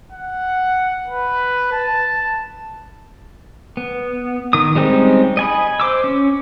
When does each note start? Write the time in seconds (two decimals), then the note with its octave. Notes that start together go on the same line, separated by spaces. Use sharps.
0.12 F#5
1.07 B4
1.72 A5
3.77 B3
4.53 D#3 D#6
4.75 G3 G#3 C4 C#4 D#4
5.37 D#5 G#5 B5
5.80 C5 D6 E6
6.04 C#4